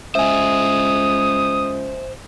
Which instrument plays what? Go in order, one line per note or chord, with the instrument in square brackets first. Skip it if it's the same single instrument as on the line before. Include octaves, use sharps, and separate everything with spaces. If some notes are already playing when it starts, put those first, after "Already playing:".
[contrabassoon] C#2 [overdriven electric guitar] C5 D#5 [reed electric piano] E5 G#5 [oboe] D#6